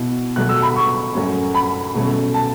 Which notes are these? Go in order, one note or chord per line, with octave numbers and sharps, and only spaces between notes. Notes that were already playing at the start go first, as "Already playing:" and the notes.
Already playing: B2 B3 E4
B2 F#3 A3 F#6
E6
B5
C#6
F#2 F#3 A3 C#4
B5
B2 A3 C#4
A5